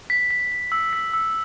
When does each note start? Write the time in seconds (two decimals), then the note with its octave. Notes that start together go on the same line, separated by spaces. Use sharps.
0.10 B6
0.30 B6
0.52 B6
0.72 E6
0.93 B6
1.13 E6